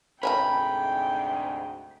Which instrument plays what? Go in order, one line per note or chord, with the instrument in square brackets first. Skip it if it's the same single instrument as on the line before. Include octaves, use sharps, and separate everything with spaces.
[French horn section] D2 G#2 C3 [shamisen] C#5 G#5 A#5 [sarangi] G5 [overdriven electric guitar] B5